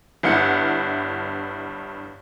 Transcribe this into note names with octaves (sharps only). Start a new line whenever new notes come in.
G1 G2 E4 F#5 F6 C#7